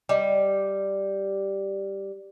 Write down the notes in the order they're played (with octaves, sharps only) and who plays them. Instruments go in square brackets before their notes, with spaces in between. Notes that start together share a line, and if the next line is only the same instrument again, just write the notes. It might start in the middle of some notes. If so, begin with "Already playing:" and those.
[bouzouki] G3 [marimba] D#5